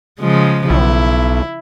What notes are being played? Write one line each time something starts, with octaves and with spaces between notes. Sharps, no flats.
C#3 F3 G#3
B1 E4